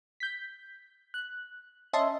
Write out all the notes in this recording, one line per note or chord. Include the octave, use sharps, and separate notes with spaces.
G6 B6
F#6
C#4 D#5 E5 A5 C6